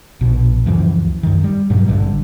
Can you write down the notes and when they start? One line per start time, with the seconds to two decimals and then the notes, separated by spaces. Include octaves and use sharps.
0.21 A#1 B2
0.66 C#2 F#2 E3 F3
1.23 F#2 D#3
1.44 G3
1.70 G2 B2 F#3 G3
1.88 G#1 G2 D3